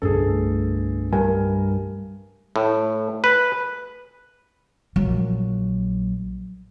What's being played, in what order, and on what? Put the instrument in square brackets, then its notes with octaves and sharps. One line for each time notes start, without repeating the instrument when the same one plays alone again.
[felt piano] G1 [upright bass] C2 A3 [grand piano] G#4 A4
[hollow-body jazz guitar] G2 [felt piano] A#4 [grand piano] G#5
[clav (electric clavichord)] A2
B4
[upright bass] A#1 F#3